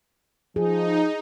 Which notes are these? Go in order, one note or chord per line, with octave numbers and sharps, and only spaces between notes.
F3 D#4 G#4